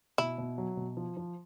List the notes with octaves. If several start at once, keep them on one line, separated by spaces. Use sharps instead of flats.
B2 E4
B2
F#3
B2
F3
F3